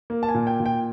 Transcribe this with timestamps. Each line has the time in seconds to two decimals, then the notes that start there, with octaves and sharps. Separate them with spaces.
0.10 A#3
0.23 A5
0.29 G#5
0.34 A#2
0.47 G5
0.60 A#2
0.66 G5